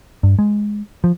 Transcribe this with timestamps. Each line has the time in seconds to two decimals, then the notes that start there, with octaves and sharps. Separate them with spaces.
0.23 G2
0.39 G#3
1.04 F3